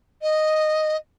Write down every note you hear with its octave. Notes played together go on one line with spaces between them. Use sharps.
D#5